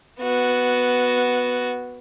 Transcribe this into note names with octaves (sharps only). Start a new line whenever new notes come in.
B3 F#4